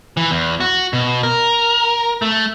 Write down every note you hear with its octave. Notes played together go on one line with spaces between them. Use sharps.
E3
E2
F#4
B2
A#4
A3